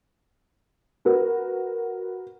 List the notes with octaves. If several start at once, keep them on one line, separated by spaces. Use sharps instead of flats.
F#4 A#4 B4